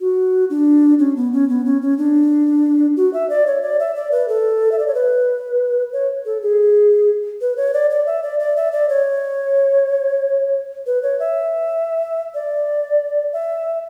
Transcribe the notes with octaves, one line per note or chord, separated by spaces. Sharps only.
F#4
D4
C#4
B3
C#4
B3
C#4
C#4
D4
F#4
E5
D5
C#5
D5
E5
D5
B4
A4
E5
D5
C#5
B4
C#5
A4
G#4
B4
C#5
D5
D5
E5
D5
D5
E5
D5
C#5
B4
C#5
E5
D5
E5